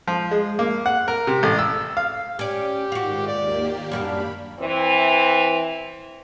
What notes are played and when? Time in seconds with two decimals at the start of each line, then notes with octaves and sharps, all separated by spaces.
0.08 F3
0.31 G#3
0.59 A#3
0.86 F#5
1.08 A#4
1.27 C3
1.43 A1
1.59 E6
1.97 F5
2.39 C#4 G4 D5
2.92 G#2 D#3 F4 F#4
3.27 D#2 A#3 G4 D5
3.92 F#2 G3 D4 F5 B5
4.59 E3 C4